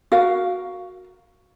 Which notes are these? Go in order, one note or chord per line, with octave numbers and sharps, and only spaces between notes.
F#4 A#4 F5